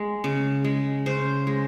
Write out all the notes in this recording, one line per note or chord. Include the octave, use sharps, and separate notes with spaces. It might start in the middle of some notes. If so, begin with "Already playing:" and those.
Already playing: G#3
C#3
G#3
C#3 C5
G#3